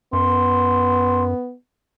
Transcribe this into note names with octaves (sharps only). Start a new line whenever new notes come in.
F#2 B3 C6